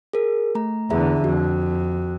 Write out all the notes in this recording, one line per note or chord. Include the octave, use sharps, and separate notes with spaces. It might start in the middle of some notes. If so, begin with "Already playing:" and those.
G#4 A#4
A3 A#5
E2 D3 G#4 E5 A#5
F2 F#4